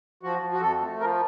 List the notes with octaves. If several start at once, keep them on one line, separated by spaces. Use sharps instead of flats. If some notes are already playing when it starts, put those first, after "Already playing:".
F3 F#4
F3
F#4
F2 A4
A3
F3 A#4